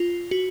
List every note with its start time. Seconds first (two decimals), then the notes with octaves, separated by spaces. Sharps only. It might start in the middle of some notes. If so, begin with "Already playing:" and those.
Already playing: F4
0.31 F#4